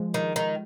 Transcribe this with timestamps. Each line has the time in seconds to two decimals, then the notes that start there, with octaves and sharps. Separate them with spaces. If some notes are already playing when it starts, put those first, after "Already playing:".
Already playing: F3 G#3
0.14 D#3
0.36 D#3